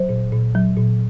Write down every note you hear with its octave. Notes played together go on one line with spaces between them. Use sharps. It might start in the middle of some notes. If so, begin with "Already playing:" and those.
Already playing: F#3 C5
A#2
A#2
F#3
A#2